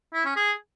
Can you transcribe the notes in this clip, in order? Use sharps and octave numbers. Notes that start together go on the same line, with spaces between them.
E4
C#4
G#4